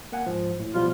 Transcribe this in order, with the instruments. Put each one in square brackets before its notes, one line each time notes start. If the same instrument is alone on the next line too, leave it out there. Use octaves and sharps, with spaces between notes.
[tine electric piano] A#3 F#5 G#5
G#2 F3
A2
[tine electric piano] B2 F3 G3 [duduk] F4